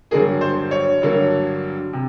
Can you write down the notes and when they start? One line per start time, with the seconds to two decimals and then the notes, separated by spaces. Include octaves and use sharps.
0.11 G2 D3 F#3 A#3 G#4
0.41 C5
0.71 C#5
1.02 G2 D3 F#3 A#3
1.93 C3